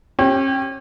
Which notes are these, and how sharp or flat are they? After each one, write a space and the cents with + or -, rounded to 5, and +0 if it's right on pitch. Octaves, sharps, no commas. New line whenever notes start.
C#4 -40 G4 +0